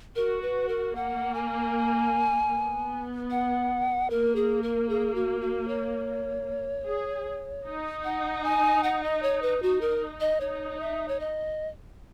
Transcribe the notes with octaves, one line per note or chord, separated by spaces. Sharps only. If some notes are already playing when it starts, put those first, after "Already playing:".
F#4 A#4
B4
A#4
A#3 F#5
G#5
B3
F#5
A#3 A#4
G#4
A#4
G#4
F#4
F#4
C#5
G#4
D#4
F#5
G#5
F#5
D#5
C#5
B4
D#4 F#4
A#4
D#5
D#4 C#5
E5
C#5
D#5